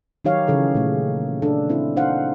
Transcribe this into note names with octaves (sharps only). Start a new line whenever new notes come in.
D#3 F#3 D#4 G4 C#5 F5
C#3 E3 G#4 A4
A#2 A3
D4 A4
C4 E4 C5
D4 D#4 C5 F5 F#5